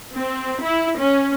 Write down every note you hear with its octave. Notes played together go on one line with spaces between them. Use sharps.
C4
E4
C#4